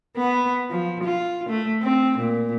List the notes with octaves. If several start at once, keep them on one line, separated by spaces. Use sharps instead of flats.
B3
F3
F4
A3
C4
A#2